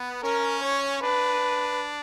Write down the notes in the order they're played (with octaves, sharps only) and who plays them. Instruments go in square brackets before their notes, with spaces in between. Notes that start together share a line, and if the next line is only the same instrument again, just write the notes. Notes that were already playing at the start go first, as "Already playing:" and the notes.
Already playing: [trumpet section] B3
[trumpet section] C#4 [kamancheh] A#4
[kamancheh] C#5
[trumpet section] D4 [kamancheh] B4